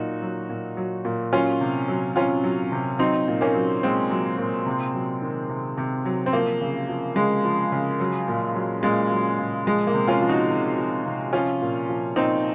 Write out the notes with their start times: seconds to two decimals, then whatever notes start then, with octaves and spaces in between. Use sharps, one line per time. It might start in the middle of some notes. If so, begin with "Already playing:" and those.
Already playing: A#2 F#3 D#4 F#4
0.22 F#3
0.50 A#2
0.77 F#3
1.05 A#2
1.33 F#3 C#4 F4
1.61 C3
1.88 F#3
2.16 C3 C#4 F4
2.44 F#3
2.72 C3
2.99 F#3 C4 D#4
3.28 A#2
3.41 A#3 C#4
3.55 F#3
3.83 A#2 G#3 C4
4.11 F#3
4.38 A#2
4.66 C3
4.94 F#3
5.22 D#3
5.49 C3
5.77 C3
6.05 F#3
6.26 C4
6.33 F3 A#3
6.61 C#3
6.89 F3
7.16 C#3 G#3
7.45 F3
7.72 C#3
8.00 F#3
8.28 A#2
8.55 F#3
8.83 A#2 G#3
9.10 F#3
9.39 A#2
9.67 F3 G#3
9.87 A#3
9.94 C3
10.08 C#4 F4
10.21 F3
10.29 D#4 F#4
10.50 C3
10.78 F3
11.06 C3
11.33 F3 C#4 F4
11.62 A#2
11.89 F3
12.16 A#2 C4 D#4